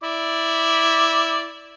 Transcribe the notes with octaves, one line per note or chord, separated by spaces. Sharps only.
E4 D5 D6